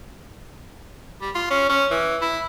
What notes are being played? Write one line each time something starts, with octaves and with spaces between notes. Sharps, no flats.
G3
F4
C#4
C#4
E3
E4